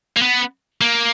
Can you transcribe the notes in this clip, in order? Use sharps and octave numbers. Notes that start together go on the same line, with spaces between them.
A#3
B3
A#3